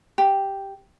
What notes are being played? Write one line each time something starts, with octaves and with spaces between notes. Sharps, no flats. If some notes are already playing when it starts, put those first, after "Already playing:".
G4